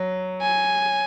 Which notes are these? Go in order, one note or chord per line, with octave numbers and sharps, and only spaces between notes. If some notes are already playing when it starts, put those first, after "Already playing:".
Already playing: F#3
G#5